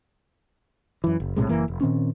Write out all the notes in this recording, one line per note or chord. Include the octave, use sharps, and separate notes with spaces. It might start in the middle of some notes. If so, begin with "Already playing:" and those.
F#2 E3
F#1
B1 A2 C3 G#3
F#1 F#2 E3 A#3
F1
A#2 D#3 C4 C#4